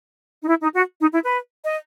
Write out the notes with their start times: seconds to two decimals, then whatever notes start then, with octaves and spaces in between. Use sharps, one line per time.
0.43 D#4
0.49 E4
0.62 D#4
0.74 F#4
1.01 D#4
1.13 E4
1.25 B4
1.64 D#5